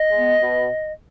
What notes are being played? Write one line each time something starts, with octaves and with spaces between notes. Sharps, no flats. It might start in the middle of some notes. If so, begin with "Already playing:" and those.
Already playing: D#5
G#3 B3
B2